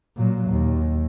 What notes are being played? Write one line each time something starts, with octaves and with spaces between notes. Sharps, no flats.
A#2 F#3
D#2